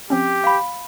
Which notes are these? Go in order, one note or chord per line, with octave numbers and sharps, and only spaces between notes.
F3 C4 C#4 G4
F5 B5